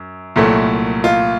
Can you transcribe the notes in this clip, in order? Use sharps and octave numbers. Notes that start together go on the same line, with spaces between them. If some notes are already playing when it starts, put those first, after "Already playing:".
Already playing: F#2
C2 A#2 F#3 A3
F4